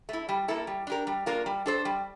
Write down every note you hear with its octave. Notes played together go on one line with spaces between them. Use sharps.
A3 E4
G3
A#3 E4 A4
G3
D4 G4 A#4
G3
A#3 D4 F4 A#4
G3
D4 A4 C5
G3